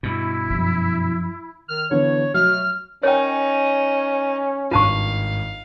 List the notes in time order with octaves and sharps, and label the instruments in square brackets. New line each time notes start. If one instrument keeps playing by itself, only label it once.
[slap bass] G2 B2 [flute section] E4
[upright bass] F#2 F3
[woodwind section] D#3 F6
[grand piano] D3 E3 B3 [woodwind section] C#5
[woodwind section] B2 A3 [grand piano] F#3 [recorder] F6
[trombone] C#4 [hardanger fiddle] D#4 [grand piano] A#4 D#5 G#5 [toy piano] C#5 G5
[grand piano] G#1 G2 [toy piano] F4 A5 C#6 [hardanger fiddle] F5